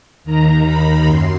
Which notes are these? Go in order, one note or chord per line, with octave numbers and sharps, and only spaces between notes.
D#2 D#3 A#5
B5
F#2 C6